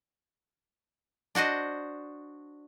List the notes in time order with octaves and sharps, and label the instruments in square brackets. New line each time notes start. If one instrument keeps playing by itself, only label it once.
[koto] D4 F#4 C5 D#5